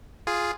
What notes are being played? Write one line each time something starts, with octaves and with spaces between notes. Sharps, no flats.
F4 G#4